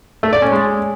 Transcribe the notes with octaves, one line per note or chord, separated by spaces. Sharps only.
A3
D5
C#4
G#3